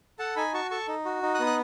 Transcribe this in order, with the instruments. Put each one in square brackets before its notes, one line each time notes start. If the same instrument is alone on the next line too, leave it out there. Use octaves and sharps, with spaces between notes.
[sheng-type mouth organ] A4 F#5 A5
D#4 G#5 B5
F#4 A5 C#6
A4 A5 C#6
D#4
F#4
D#4
D#6 F#6
B3
F#6